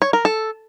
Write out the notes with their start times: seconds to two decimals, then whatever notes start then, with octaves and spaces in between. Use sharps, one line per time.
0.02 C#5
0.13 A#4
0.25 A4